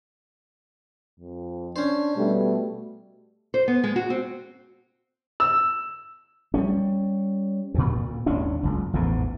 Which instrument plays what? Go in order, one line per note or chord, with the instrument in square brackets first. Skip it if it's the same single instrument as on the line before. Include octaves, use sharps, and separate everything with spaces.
[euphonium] F2
[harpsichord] C#4 C5 [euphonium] D4
[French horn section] B2 A3 [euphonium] G3
[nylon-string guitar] C5
B3
G#3
F#4
C4
[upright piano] E6
[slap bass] G3 G#3 C#4
D2 A#2
G#1 D#2 C#4 D4
F#1 C#2
A1 E2 G#2 B2